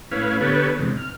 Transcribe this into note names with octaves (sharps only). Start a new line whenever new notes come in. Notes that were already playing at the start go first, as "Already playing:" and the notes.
A2 C#4 E4 B4 F5
D3 B3 G4 A4 B4 C#5
E2 G#2 C3
F6